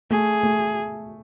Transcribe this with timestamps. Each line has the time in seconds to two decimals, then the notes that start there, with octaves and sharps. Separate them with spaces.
0.11 A3 G#4
0.43 A3